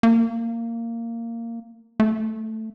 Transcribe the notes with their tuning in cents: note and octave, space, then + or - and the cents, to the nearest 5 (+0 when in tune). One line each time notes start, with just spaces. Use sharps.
A#3 -15
A3 +5